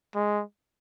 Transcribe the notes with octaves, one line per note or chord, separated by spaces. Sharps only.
G#3